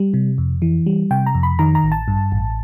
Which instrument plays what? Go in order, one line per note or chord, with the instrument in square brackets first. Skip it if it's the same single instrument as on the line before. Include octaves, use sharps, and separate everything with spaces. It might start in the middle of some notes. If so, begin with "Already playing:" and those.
Already playing: [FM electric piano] G3
C3
F2
E3
G3
C3 G5
A#5
F2
B5
D#3 A#5
A#5
A1
A5
G2
A1